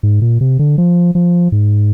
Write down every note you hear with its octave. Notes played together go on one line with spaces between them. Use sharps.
G#2
A#2
C3
D3
F3
F3
G#2